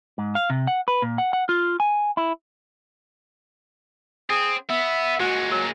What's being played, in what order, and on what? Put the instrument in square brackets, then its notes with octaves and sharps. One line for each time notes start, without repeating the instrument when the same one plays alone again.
[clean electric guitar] G#2
F5
C3
F#5
B4
A#2
F#5
F#5
F4
G#5
E4
[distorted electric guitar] C4 [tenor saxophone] G#4
[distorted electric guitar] B3 [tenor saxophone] E5
[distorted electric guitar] A#2 G#3 [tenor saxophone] F#4
[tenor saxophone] F#3